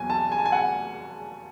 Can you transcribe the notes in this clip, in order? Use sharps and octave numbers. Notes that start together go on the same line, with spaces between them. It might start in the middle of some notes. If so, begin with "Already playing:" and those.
Already playing: E2 B2 F#3 A#3 G#5
A5
G#5
A5
G#5
F#5